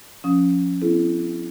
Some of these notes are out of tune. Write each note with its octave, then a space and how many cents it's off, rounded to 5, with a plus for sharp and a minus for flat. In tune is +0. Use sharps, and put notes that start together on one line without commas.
F3 +20 C#4 +0 D#6 +15
C4 -35 E4 +30 A4 -40